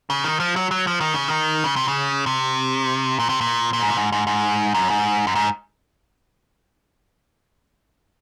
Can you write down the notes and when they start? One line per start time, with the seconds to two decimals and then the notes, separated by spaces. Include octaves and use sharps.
0.10 C#3
0.24 D#3
0.40 F3
0.56 F#3
0.71 F#3
0.87 F3
1.00 D#3
1.14 C#3
1.28 D#3
1.64 C#3
1.76 C3
1.88 C#3
2.26 C3
3.19 A#2
3.29 C3
3.41 A#2
3.73 A#2
3.81 G#2
3.90 A#2
3.97 G#2
4.12 G#2
4.27 G#2
4.74 F#2
4.90 G#2
5.27 F#2
5.35 G#2